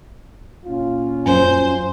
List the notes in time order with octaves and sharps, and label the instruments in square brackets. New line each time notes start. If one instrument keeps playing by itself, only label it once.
[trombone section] A#2 C#4 F4
[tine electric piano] F#2 G#5 [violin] C5